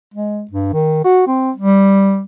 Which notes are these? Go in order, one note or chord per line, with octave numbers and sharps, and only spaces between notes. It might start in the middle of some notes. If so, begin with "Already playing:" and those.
G#3
G2
D#3
F#4
C4
G3